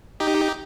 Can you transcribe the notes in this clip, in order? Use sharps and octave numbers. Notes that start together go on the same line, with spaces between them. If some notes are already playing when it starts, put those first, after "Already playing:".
D#4 G4